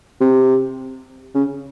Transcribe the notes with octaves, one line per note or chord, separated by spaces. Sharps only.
C3
C#3